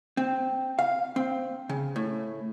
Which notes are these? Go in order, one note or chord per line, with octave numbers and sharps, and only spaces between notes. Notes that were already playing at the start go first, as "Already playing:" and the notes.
C4
F5
C4
C#3
A2